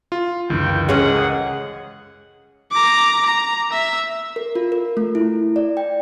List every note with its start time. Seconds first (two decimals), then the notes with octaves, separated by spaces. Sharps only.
0.12 F4
0.50 C#2 F#2 D3 E3 A#4 G5
0.89 G#3 A#3 C#4 G#4 F#5
2.72 A#5 D6
3.26 A#5
3.72 E5 E6
4.36 A#4
4.55 F4
4.72 A#4
4.97 A3
5.15 E4
5.56 D5
5.77 G5